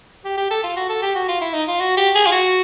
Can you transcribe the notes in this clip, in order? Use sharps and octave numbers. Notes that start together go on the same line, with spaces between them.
G4
G4
A4
F4
F#4
A4
G4
F#4
F4
E4
D#4
F4
F#4
G4
G#4
F4
F#4